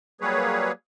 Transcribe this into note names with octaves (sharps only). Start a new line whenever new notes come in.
F#3 G3 A#3 G#4 B4 C#5